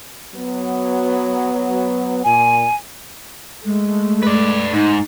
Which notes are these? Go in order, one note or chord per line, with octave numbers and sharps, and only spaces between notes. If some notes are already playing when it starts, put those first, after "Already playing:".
F#3 B3
A#2 G#5
G#3 A3
B4 D5
G#2 D#4